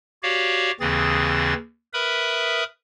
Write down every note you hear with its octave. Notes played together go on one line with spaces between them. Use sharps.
F#4 G4 C#5 D5 F5
D#2 C#3 E3 C4 G#4 A6
A#4 B4 E5 B5 D#6